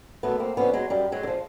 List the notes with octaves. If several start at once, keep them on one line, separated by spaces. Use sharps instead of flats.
F#2 A3 B3
A#3 C4
D3 F3 B3 C#4
F#3 G#3
F#2 G3
F#3 G#3
D3
F3